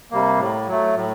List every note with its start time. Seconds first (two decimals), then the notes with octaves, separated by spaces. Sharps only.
0.11 C3 G3 A#3
0.40 A2
0.68 F#3 A3
0.96 A2